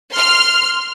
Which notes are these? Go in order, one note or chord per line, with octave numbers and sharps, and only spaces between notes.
C6 F6